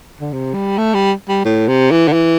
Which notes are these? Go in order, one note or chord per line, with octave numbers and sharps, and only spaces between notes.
D3
C3
G3
A3
G3
G3
A2
C3
E3
D3
E3